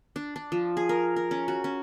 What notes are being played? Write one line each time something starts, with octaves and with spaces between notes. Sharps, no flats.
D4
D4
F3
G#4
A#4
A#4
C#4
F#4
C#4